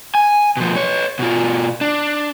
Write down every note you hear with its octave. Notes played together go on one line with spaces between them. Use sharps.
G#5
B2 F3
B4 C#5
B2 F4
D4